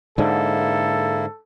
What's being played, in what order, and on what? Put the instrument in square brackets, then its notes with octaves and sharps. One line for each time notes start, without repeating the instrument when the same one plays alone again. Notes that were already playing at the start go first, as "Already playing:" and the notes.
[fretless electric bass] G#2 D3 [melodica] A#3 E4 [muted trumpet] A4